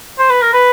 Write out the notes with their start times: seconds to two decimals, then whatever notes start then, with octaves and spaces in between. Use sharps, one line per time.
0.19 C5
0.30 B4
0.42 A#4
0.53 B4